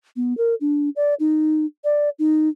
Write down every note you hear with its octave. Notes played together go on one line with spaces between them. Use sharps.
B3
A#4
D4
D5
D#4
D5
D#4